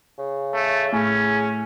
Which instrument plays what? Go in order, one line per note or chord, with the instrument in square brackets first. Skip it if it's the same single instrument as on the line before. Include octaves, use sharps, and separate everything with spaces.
[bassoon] C#3
[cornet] A3
[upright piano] A2 [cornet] C#4 [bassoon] G#4